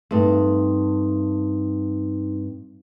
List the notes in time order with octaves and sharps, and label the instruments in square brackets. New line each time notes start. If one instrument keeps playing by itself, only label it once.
[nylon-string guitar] G2 A3 [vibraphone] C4 D#4